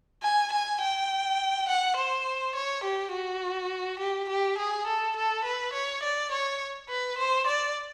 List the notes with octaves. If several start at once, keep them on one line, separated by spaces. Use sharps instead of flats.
G#5
G#5
G5
F#5
C5
C#5
G4
F#4
G4
G4
G#4
A4
A4
B4
C#5
D5
C#5
B4
C5
D5